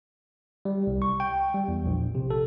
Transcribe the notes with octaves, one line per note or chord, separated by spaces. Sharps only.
G3
C2
C#6
G5
G3
E2
A#1
C3
A4